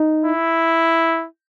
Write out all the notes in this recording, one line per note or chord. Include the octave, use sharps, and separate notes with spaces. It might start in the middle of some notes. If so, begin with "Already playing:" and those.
Already playing: D#4
E4